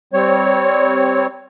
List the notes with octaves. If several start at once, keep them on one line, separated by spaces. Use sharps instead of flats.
G3 C4 C#5